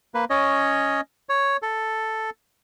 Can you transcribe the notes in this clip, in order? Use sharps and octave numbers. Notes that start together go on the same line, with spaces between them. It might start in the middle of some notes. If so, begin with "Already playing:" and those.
A#3 B4
C#4 C#5 D#5
C#5
A4